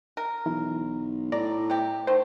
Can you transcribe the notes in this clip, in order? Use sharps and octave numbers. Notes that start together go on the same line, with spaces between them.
A#4
B1 E3
A2 D5 A#5
C3 G4
D#3 A3 C5